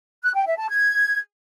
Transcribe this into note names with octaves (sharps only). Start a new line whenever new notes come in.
F#6
G5
E5
A5
G#6